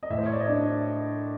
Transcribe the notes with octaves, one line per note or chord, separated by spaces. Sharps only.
D#5
A2 E5
C5
C#5
D5
D#5
D4 E5